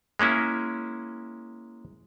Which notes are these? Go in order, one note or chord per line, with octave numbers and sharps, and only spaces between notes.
G#3 A#3 C#4 E4